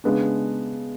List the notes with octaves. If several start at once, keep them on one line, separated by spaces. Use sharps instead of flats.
C#3 G#3 B3 D4